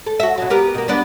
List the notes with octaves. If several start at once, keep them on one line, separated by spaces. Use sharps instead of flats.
A4
F#4 E5
B2 F#3
B3 G4 A#4
B2 A#3
G3 B3 D4